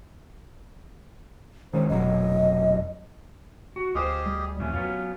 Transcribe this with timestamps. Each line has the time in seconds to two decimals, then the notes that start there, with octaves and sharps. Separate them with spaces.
1.73 D#3 G#3 C#4 C5
1.89 F1 B2 F#3 D#5
3.76 F#4
3.95 D2 F4 G4 G#4 B4 C5 D#5
4.26 G3
4.60 F2 A2 E3 C#4
4.73 F#3 B3 F4